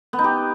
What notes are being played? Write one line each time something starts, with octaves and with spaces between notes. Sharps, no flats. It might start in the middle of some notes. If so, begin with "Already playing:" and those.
B3
D#4
G4